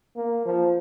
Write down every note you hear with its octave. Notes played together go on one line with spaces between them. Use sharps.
A#3
F3